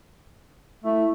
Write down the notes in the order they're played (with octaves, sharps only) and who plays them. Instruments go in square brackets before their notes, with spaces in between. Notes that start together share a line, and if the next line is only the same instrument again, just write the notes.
[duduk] A3 [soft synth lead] E4